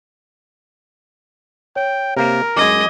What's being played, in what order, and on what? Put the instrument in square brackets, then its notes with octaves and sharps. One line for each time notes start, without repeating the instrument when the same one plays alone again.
[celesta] C#5 [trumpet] G5
[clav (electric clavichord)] C3 A#3 [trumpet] A#4
[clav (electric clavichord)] F#2 G#3 [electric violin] D#5 [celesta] D6 G#6